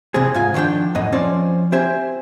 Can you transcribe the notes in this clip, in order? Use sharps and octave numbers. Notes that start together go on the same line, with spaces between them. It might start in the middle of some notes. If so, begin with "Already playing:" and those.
C3 E3 G3 C4 G#4
G#2 F4 G#5
D#3 F3 A3 D4 G5
F#2 A2 D#5
F3 C4 C#4 C5 D5
C4 G4 C5 E5 G#5